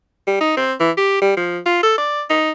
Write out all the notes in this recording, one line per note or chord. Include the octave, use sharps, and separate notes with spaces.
G3
D#4
C4
E3
G4
G3
F3
F4
A4
D5
D#4